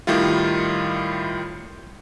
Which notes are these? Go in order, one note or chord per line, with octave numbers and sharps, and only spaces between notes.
A2 D#3 G3 E4 F4